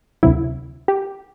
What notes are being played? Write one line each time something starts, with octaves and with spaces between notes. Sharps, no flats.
D2 C3 F#3 E4
G4